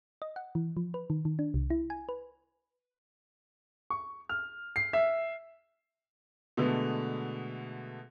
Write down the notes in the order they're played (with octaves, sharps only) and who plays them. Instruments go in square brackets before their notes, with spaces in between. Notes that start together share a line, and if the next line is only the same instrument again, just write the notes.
[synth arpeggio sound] D#5
F#5
E3
F3
B4
D#3
D#3
D4
C2
E4
G#5
B4
[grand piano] C#6
F6
C7
E5
[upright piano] B2 D3 G#3 A3 B3